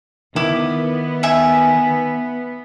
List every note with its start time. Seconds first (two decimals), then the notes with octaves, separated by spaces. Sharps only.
0.36 D#3 B3 E4 D6
1.23 E5 G#5